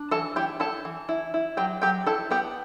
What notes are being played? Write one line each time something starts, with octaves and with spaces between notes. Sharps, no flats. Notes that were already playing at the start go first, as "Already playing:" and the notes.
Already playing: D4
E3 A4 A5
E4 G4 G5
E4 A4 A5
E3
E4
E4
F#3 G4 G5
F#3 G4 G5
E4 A4 A5
B3 G4 G5